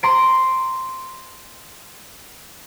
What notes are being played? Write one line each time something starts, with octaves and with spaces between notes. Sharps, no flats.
A#5 C6 A#6 C7 D7